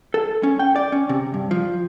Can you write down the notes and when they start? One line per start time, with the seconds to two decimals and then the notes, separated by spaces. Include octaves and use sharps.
0.14 A4
0.43 C#4
0.59 G5
0.76 D5
0.92 C#4
1.09 C3
1.34 G2
1.51 F3